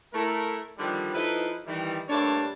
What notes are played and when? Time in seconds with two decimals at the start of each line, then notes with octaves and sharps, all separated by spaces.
0.14 A3 E4 A#4
0.78 D3 D#3 F3 G3
1.14 F3 D#4 E4 A4 B4
1.66 D#3 E3 G3
2.09 G2 A3 A#3 D4 C#5 A5